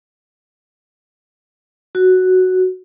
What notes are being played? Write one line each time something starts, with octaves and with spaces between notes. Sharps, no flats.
F#4